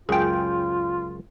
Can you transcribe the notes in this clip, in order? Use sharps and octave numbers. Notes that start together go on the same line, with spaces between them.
C#2 F#2 C#3 F4 G#4 G5